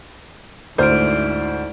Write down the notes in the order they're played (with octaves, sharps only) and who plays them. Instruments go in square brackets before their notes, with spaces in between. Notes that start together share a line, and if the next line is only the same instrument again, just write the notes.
[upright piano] D2 [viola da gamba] G#2 E4 [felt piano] C5 [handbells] D5 F6 D7